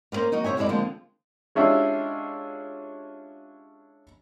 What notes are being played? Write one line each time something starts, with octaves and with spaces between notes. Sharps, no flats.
A#3 B3 C#4 A#4 C5
F#3 A#3 D#4
C3 C5 C#5 E5 G#5
F#2 F#3 G#3 E4 D5
D3 F3 G#3 A#3 C4
G#3 C#4 D4 E4 F4 G4